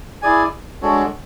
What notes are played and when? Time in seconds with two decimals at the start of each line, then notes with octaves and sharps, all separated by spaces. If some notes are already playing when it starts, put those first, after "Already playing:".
0.22 E4 G#4 D5 G#5
0.82 G#3 D4 F#4 A4 C#5